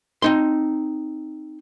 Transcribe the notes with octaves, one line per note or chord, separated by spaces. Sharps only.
C4 D#4 C6